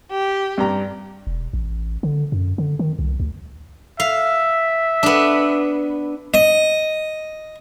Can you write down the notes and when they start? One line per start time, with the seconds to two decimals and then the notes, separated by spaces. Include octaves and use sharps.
0.11 G4
0.58 G2 A#5
1.27 E1
1.53 A1
2.03 D3
2.32 F#2
2.58 D3
2.79 D#3
2.99 C2
3.20 D2
4.00 E5 F5
5.03 B3 D4
6.34 D#5